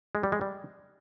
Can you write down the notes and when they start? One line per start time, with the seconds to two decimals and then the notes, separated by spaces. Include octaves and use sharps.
0.15 G#3
0.23 G3
0.32 G#3
0.41 G3